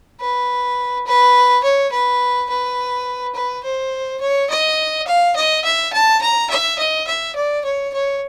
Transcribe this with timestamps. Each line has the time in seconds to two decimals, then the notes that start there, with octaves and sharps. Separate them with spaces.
0.20 B4
1.07 B4
1.64 C#5
1.92 B4
2.49 B4
3.35 B4
3.64 C5
4.21 C#5
4.50 D#5
5.07 F5
5.36 D#5
5.65 E5
5.93 A5
6.22 A#5
6.50 E5
6.79 D#5
7.07 E5
7.35 D5
7.65 C#5
7.94 C#5